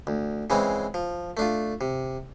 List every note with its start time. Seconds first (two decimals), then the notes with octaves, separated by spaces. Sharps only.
0.07 D2
0.50 C#3 E3 G#3 C4
0.94 F3
1.37 A3 D4 F4
1.81 C3